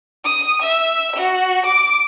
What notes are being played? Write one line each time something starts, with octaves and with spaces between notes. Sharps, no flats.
D#6
E5
F#4
D6